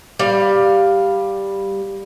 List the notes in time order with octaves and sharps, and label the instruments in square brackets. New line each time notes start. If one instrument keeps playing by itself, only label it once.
[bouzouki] G3 F5